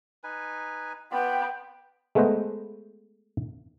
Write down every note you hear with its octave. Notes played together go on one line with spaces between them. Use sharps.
D#4 B4 G#5
B3 F4 D5 G5 B5
G#3 A3 B3 B4 C5 D#5